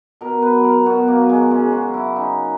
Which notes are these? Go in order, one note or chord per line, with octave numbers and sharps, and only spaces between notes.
B2 A#4
B4
F#3
A#4
B2 F#4
A#3
F#3
G#3
C#3 G#3
F#4
F#3
E4
C#3 D#4